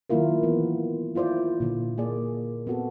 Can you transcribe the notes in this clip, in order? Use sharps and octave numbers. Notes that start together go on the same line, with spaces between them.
D#3 F#3 A#3 E4 F4 A#4
E3 B3
E4 F4 C5 D5
A#2 D3
A#3 G#4 D5
B3 C4 F#4 A4